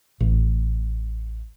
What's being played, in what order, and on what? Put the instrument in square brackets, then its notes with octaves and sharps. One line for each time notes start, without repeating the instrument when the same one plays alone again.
[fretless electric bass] A1